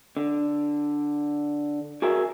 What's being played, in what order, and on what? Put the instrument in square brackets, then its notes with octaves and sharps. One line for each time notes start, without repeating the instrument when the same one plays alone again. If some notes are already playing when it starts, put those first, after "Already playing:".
[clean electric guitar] D3
F#4 G#4 A#4 E5